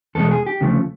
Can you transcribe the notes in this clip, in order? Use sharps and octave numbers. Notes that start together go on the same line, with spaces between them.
E2 B2 G#3 A4
G#4
G4
D2 C#3 F3 A3